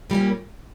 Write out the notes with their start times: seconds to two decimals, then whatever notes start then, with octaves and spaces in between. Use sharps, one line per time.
0.10 A#2 G3 A#3 C#4